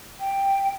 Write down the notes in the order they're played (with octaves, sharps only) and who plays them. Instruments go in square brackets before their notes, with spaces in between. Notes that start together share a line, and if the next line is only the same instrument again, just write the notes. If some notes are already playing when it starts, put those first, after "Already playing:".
[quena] G5